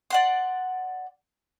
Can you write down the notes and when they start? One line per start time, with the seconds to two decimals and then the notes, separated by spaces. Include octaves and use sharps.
0.10 D5 F#5 C6